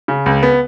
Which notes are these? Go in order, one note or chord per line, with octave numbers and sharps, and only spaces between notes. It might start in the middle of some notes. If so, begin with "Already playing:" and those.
C#3
C#2
B3